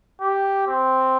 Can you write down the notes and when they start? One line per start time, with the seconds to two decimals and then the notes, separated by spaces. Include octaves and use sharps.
0.21 G4
0.68 C4